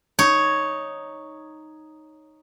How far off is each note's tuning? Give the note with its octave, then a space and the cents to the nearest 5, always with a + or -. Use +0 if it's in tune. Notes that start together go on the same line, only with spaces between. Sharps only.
D#4 +0 C#5 +0